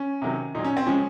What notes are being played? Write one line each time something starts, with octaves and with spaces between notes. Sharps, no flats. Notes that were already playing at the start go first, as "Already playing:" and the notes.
Already playing: C#4
C3 D#3 F#3
A#2 F#3 D#4
C#4
C4
C#3 F3 G#3 C#4